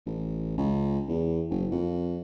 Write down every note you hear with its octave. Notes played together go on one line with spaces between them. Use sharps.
A1
C#2
E2
F#1
F2